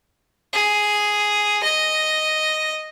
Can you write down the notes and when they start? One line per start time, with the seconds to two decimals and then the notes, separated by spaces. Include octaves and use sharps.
0.53 G#4
1.63 D#5